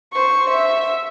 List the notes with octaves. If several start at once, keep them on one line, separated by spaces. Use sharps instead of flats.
C5 C#6
E5